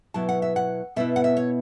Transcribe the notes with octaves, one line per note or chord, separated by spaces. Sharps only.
B2 F#3 B3 E4 A5
F#5
E5
F#5
B2 B3 E4 E5
F#5
E5
C#5